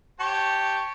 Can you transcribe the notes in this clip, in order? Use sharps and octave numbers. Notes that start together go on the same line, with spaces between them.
G4 C#5 A5 C#6